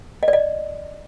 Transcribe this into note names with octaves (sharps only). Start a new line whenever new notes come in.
D#5
D5
D#5